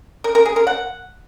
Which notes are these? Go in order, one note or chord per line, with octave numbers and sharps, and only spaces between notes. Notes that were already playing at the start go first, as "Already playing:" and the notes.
A#4
A#4
G#4
A#4
F#5